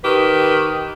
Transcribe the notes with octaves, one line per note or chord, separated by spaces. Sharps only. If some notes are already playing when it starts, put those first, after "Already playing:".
D#3 G4 B4